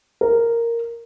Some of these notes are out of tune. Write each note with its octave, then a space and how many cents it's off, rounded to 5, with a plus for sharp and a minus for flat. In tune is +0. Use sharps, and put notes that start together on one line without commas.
A#4 -5